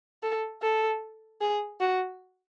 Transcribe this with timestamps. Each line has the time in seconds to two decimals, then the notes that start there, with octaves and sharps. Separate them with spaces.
0.23 A4
0.62 A4
1.41 G#4
1.80 F#4